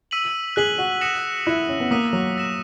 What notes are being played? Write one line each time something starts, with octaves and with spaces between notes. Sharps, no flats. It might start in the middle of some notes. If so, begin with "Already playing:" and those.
E6 B6 D#7 F#7
G#4 F#6 B6 F#7
F#4
D#6 A#6 C#7 E7
E4 F#6 C#7 E7
C#4
B3
A#3 D#6 F#6 B6 D#7
F#3
E6 A#6 E7